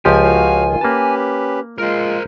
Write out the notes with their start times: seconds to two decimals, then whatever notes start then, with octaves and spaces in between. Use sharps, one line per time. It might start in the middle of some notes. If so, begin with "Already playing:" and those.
0.05 C#2 F3 G4 G#5
0.22 F#4 C#5 F5
0.66 D#3 F4
0.81 A#3 C#4 G4 B4 A5
1.78 G#3 F4 A#4 C5